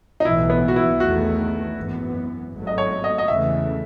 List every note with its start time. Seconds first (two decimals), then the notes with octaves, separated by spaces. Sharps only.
0.20 D#4
0.25 B1 A2 E3 E4
0.50 B3
0.68 F#4
0.76 E4
1.00 E2 D#3 A3 F#4
1.77 G#1 F#2 E3 B3
2.53 G#1 G#2 F#3 A3
2.67 D#5
2.78 C#5
3.04 D#5
3.18 D#5
3.28 E2 C#3 E3 A3 E5